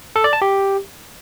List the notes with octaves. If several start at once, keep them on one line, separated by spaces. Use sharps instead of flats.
A4
D5
A5
G4